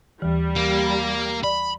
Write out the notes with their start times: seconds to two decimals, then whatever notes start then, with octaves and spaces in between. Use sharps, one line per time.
0.22 D#2 E3 G3
0.56 A#3
0.87 B5
1.44 D5 B5